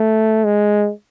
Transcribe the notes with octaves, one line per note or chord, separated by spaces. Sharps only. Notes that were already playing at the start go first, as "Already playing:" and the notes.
Already playing: A3
G#3